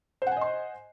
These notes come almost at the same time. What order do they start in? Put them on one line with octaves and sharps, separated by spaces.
C5 F#5 G#5 D#5 C6